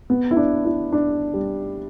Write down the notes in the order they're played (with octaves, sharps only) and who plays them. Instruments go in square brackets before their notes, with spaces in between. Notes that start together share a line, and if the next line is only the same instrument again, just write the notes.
[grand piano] B3
E4
D4
E4
D4
G3